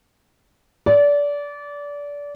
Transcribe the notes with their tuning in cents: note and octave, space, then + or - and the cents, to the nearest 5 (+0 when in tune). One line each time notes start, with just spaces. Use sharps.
D5 -25